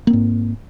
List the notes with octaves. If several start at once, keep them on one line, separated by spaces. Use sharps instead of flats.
G#2 A#3 C4